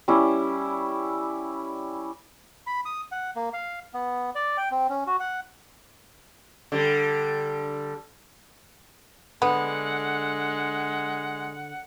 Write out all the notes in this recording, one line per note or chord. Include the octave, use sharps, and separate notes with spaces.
G3 C#4 E4
B5
D#6
F#5
A#3
F5
B3
D5
G5
C4
C#4
F#4
F#5
D3 G3
D3 G#3 B3 F#5